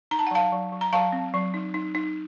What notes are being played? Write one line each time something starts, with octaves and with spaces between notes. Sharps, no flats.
D#4 A#5
A5
F#5
F#3 F5 A5
F#3
F#3
A#5
F#3 F5 A5
C4
F#3
D#4
D#4
D#4